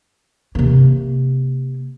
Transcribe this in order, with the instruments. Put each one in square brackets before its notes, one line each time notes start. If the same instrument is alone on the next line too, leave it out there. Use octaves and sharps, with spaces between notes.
[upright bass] C3 A#3